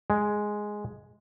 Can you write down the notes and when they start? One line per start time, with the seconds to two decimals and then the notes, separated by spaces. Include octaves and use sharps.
0.10 G#3